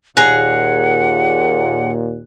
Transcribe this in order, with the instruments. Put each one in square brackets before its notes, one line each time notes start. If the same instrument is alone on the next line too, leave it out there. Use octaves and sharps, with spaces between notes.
[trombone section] D#2 A#2 [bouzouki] G#4 A#5 [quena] F#5 [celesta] F#6